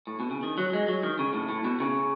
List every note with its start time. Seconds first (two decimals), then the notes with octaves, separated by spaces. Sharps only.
0.07 A2
0.20 B2
0.31 C#3
0.43 D#3
0.58 F#3
0.73 G#3
0.88 F#3
1.03 D#3
1.19 C#3
1.34 A2
1.49 A2
1.65 B2
1.80 C#3